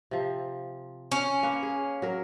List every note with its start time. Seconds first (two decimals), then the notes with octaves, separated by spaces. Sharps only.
0.11 C3 F3
1.12 C#4
1.43 A#3 B4 F5
1.63 G#4
2.02 F#3 A#4